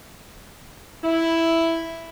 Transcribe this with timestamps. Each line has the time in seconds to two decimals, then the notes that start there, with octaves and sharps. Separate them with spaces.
1.04 E4